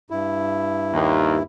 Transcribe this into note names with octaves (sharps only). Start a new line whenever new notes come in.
G2 E4
D#2